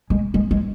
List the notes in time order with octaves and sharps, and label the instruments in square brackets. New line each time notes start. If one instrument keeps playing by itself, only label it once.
[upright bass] G#3
G#3
G#3